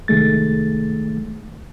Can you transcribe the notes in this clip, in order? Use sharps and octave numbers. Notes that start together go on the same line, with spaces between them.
C2 D#3 G#3 A3 A6